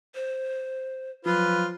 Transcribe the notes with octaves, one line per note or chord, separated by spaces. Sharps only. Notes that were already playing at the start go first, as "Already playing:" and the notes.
C5
F3 F#3 F4 B4